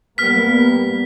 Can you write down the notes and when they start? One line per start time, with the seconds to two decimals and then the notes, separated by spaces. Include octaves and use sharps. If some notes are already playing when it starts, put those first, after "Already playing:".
0.18 G3 A#3 B3 F6 B6